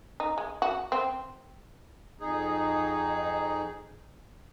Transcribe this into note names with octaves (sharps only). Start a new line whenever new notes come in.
D#4
G#3
F#4
C4
F2 D#4 G#4